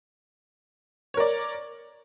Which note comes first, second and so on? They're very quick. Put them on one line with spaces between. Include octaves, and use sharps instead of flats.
C#5 A#4 D5